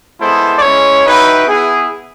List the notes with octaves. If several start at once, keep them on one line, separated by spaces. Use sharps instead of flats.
G#3 B3 E4 A4 C5
D5
G#3 C#4 E4 C#5
D#4 F#4 B4 E5 G5
B3 E4 G#4